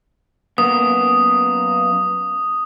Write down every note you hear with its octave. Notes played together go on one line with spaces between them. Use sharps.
F#2 A#3 B3 D#6